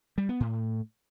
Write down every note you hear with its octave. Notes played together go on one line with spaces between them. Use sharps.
G3
B3
A2